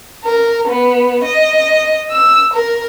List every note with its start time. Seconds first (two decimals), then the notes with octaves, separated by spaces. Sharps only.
0.24 A#4
0.67 B3
1.22 D#5
2.11 E6
2.53 A#4